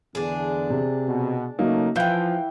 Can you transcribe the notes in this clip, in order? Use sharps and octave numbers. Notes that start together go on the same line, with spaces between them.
E2 D3 D4 G#4
C3
B2
C#3 F#3 A3 A#3 D#4
E3 F3 F5 G5 G6